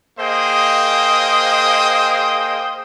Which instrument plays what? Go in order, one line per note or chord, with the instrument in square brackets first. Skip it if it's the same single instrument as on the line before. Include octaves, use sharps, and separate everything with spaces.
[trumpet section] A#3 G#4 C5 D#5 G5 D#6